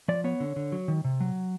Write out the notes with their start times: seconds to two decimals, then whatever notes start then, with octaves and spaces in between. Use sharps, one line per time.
0.08 F3 D5
0.24 B3 C#5
0.40 D3
0.56 D3
0.72 F#3
0.88 D#3
1.04 C3
1.20 F#3